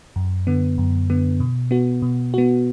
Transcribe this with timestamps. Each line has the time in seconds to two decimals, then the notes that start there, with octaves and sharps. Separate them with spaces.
0.16 F#2
0.47 D3 B3
0.78 F#2
1.10 D3 B3
1.40 B2
1.71 B3 F#4
2.02 B2
2.34 B3 F#4